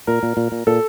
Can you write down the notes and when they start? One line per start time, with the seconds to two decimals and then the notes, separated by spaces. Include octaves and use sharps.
0.07 A#2 A#4
0.23 A#2
0.37 A#2
0.52 A#2
0.67 A#2 A4